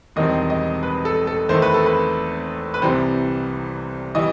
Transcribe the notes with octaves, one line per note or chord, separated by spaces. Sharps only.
E1 E2 D#3 G3 C4 D#5
D#5
B4
A4
A4
E2 D#3 A3 C5
B4
A4
B4
B4
C2 C3 E3 G3 C5
E3 G3 D#5